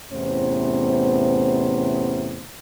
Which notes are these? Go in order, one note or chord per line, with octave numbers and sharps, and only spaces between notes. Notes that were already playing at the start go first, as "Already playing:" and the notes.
E2 A2 C3 B3 C#4 C5